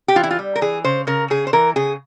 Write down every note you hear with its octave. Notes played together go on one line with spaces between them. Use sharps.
G4
E3 F4
E4
F4
G3
A#4
E3 G#4
C#3 C5
C#3 A#4
C#3 G#4
C5
E3 A#4
C#3 G#4